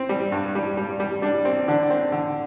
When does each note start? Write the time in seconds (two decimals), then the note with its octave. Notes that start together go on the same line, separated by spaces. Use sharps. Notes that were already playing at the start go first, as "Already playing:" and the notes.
Already playing: C4
0.09 G3
0.32 G2
0.55 G3
0.77 G3
1.00 G3
1.22 G3 D4
1.45 C4
1.68 D3 D4
1.90 C4
2.12 D3